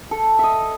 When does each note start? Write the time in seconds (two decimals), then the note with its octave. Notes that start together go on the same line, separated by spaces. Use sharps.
0.11 A4
0.39 D#5 E5